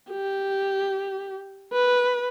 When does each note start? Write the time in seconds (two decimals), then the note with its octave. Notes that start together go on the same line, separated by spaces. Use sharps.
0.11 G4
1.73 B4